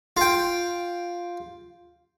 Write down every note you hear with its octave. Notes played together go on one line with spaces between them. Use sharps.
F4 G5